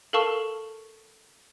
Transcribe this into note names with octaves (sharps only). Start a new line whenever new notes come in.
A4 A#4 F5 A5 C#6 E6